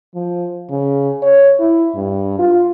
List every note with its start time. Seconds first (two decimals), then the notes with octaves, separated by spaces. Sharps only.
0.15 F3
0.70 C#3
1.22 C#5
1.60 E4
1.96 G2
2.39 F4